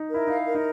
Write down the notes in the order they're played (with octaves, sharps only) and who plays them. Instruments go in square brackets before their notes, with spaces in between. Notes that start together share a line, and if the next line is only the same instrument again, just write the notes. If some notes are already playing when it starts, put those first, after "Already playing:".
Already playing: [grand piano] D#4
[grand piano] E4 [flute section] A#4
[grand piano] D#4 [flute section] F5
[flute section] A#4
[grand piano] D#4